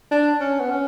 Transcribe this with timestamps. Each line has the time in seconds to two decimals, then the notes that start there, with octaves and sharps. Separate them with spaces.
0.11 D4
0.40 C#4
0.60 B3
0.70 C#4